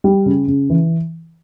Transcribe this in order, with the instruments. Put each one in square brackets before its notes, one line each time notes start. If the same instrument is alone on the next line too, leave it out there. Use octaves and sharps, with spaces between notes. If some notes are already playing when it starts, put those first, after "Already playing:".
[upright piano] G3
C#3
C#3
E3